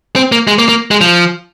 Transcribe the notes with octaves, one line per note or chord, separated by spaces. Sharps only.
C4
A#3
G#3
A#3
A#3
G#3
F3